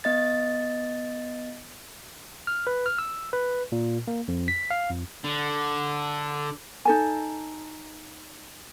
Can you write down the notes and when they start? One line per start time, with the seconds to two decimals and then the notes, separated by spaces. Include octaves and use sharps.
0.04 B3 D#5 A6
2.47 F6
2.67 B4
2.86 F6
2.98 E6
3.33 B4
3.72 A#2
4.08 A#3
4.28 F2
4.48 B6
4.71 F5
4.90 F2
5.24 D3
6.85 D#4 A4 G#5